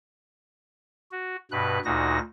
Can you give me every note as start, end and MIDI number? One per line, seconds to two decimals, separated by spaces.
1.12 1.36 66
1.51 1.79 43
1.51 1.79 47
1.51 1.79 71
1.51 1.79 90
1.85 2.19 38
1.85 2.19 46
1.85 2.19 63
1.85 2.19 66
1.85 2.19 94